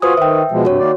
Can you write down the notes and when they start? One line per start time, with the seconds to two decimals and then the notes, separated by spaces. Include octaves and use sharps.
0.02 F4 F#4 B4 C5 G#5 D#6
0.17 D#3 E5 G5
0.51 B2 F3 G#3
0.65 G2 C3 F#4 C#5
0.79 D#3 A#3 D5